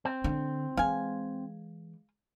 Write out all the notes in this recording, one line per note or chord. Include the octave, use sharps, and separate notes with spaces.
C4
D3
E3 G#3 F5 G#5